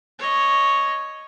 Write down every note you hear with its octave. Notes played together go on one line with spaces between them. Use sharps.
C#5 D#5